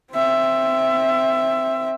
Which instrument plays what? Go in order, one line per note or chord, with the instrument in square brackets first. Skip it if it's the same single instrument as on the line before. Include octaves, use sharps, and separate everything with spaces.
[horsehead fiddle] C4 E5